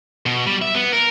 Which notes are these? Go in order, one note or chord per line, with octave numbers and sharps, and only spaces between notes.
B2
G3
E5
B3
A#4